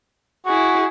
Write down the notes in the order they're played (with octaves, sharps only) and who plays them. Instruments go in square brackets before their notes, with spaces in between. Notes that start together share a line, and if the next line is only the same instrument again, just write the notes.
[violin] E4 G#4 [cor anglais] F#4